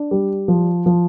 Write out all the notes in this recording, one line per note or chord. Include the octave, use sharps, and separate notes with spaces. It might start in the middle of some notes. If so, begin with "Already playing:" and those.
Already playing: D4
G3
F3
F3